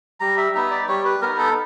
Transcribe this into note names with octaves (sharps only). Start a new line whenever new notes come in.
G3 A#5
E5
B3 D#4 E5
D5
G3 C#5
B4
B3 D#4 A#4
A4